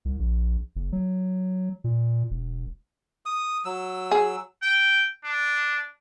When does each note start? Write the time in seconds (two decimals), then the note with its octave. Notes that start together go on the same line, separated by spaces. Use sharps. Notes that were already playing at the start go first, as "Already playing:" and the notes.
0.05 C2
0.19 A#1
0.76 F#1
0.92 F#3
1.84 A#2
2.31 E1
3.26 D#6
3.65 F#3 E6
4.11 G#4
4.62 G5
5.24 D4